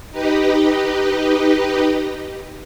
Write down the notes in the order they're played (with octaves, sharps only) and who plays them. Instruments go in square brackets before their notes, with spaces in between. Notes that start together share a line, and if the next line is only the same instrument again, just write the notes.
[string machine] D#4 G4 B4 D#5